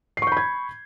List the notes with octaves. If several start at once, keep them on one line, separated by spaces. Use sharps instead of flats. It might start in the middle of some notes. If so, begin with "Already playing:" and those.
B5 C#6 G6 G#6 C7